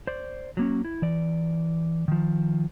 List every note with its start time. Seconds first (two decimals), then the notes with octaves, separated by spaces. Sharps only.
0.07 C5 D5
0.57 F#3 A#3 C#4
0.85 E4
1.02 E3 D5
2.08 D#3 F3